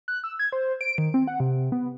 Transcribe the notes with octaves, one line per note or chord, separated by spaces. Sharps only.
F#6
E6
G#6
C5
D7
D#3
C4
F#5
C3
B3